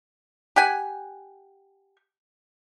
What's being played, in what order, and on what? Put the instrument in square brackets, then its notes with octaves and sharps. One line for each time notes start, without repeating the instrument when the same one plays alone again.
[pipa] G4 F#5 G#5